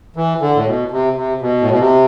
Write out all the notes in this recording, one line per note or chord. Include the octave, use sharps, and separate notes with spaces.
E3
D3
A2
B2
C3
C3
B2
A2
B2
C3